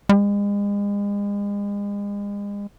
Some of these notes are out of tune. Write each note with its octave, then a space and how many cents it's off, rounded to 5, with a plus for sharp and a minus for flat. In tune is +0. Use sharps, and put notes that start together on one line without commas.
G#3 -40